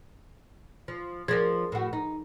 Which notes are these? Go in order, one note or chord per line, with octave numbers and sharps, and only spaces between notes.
F3
F3 D4 G#4 A#4
A2 F#4
D#4